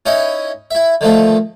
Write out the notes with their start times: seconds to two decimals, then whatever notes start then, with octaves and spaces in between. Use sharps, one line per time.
0.06 C#4 D#4 E4 D#5
0.71 E4 E5
1.01 D3 D#3 F3 A3 F4